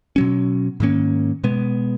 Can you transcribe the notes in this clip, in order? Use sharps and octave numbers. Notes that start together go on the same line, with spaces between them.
B2 F#3 C#4
G#2 D#3 A#3 C#4
B2 G#3 B3